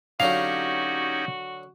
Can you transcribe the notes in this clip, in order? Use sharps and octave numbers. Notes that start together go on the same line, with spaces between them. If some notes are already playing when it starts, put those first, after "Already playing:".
D3 F#3 C#4 D#4 F#4 G4 F5 G5